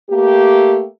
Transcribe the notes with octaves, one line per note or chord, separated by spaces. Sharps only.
A3 A#3 G4